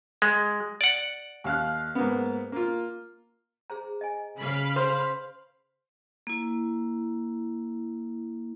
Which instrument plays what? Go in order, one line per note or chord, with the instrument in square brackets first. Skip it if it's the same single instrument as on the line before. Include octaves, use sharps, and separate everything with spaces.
[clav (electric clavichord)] G#3
D5 F#5
[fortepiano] D#2 F5 F#6
G#2 A#3 B3
A#3 F4
[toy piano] G#4 C5 A#5
D#5 G#5
[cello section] C#3 [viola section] F5 B5
[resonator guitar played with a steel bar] C5
[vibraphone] A#3 E4